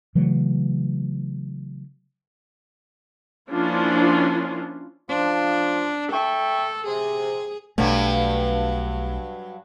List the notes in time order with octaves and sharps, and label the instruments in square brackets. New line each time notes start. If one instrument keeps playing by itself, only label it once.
[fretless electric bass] C#3 E3 F#3 A3
[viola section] F3 A#3 C#4 D4 E4 F4
[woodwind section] F3 [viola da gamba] D4
[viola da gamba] A4 [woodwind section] E5 G5 C#6
[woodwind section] C3 [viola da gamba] G#4
[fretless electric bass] B1 B2 A3 [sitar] G2 F#3